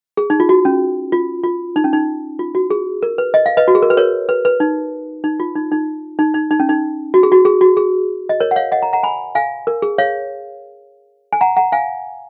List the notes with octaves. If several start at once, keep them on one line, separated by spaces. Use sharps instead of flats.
G#4
D#4
F4
F#4
C#4
F4
F4
D#4
C#4
D#4
F4
F#4
G#4
A#4
B4
D#5
F5
B4 D#5
F#4
G#4
A#4
B4
A#4 C#5
B4
B4
D#4
D#4
F4
D#4
D#4
D#4
D#4
D#4
C#4
D#4
F#4
G#4
F#4
G#4
F#4
G#4
D#5
A#4 C#5
F#5
C#5 F5
D#5 F#5
F#5 A#5
F#5 A#5
G#5 B5
F5 G#5
A#4
G#4
C#5 F5
G#5
F#5 A#5
F#5 A#5
F5 G#5